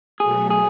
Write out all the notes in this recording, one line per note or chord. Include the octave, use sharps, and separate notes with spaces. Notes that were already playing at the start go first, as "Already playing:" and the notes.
B2 F#3 A3 G#4
G#4